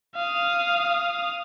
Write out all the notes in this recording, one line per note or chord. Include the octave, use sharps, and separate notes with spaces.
F5 D#6